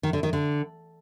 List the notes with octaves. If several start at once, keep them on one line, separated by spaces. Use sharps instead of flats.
D#3
D3
D#3
D3